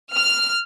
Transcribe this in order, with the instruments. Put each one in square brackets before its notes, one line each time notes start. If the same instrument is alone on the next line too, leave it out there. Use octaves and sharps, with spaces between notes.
[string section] F6